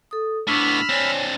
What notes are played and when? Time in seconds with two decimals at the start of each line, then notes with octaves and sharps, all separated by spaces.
0.11 A4 D#6
0.47 A2 B3 D4 B5 C#6 D6 E6 F6
0.89 C4 D4 C#5 G#5